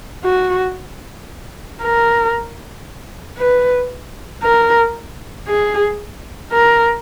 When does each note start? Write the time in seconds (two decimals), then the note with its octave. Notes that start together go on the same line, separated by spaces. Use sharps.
0.24 F#4
1.81 A#4
3.38 B4
4.43 A#4
5.47 G#4
6.51 A#4